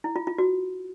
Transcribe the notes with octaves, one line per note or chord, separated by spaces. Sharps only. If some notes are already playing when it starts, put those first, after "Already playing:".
E4
F4
F4
F#4